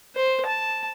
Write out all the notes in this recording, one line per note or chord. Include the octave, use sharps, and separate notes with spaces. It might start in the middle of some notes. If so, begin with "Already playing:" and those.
C5
A5